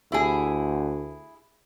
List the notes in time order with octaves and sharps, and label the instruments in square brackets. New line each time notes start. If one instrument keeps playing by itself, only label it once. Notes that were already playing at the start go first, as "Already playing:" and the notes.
[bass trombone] D2 [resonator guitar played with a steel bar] E4 G#4